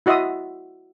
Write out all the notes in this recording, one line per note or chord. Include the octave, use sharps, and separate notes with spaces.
E4 F#4 D#5 E5 C6 D#6